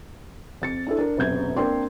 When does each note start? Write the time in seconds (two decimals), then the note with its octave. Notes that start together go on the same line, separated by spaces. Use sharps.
0.62 F2 A6 C#7
0.87 D4 E4 A4
0.99 D4 A#4
1.17 E1 F#2 C3 G6 G#6
1.57 A#3 C4 D4 D5 C6